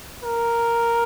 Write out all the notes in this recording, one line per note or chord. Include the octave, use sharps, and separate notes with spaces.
A#4